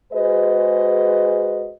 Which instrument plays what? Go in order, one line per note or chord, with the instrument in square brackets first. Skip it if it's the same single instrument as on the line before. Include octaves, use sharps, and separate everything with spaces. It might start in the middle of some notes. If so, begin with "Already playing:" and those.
[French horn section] G#3 F#4 G#4 B4 C5 D#5